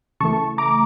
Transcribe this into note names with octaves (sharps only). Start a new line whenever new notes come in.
C#3 E3 A3 A5 C#6
A#5 D6